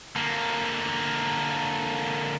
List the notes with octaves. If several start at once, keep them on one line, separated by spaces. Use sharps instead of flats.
D3 A#3